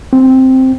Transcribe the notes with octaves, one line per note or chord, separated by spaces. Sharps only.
C4